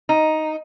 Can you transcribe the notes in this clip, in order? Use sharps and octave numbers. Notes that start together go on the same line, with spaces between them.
D#4